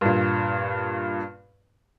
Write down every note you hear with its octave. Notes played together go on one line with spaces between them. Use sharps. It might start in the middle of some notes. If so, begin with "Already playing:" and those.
G2 A#2